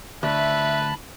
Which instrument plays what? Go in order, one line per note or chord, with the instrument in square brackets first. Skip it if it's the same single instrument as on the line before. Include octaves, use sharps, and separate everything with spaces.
[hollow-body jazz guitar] D2 [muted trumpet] B4 [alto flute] E5 [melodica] A5 B5